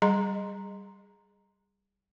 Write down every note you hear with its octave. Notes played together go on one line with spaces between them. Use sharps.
G3 G#4 D#5 A#5 C6